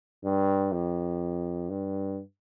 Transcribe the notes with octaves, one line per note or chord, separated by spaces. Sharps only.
G2
F2
G2